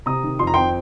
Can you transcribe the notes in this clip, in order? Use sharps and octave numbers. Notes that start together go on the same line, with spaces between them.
C3 A#5 D#6
D#3
F2 C6
A#5
C4 G5 C6